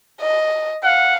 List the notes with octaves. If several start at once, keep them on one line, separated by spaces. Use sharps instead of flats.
D#5
F5 F#5